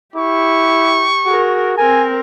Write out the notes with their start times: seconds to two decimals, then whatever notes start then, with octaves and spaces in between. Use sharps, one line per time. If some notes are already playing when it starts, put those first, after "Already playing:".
0.16 E4 G4 C#6
1.26 F#4 G#4 A#4
1.78 C4 A#4 G#5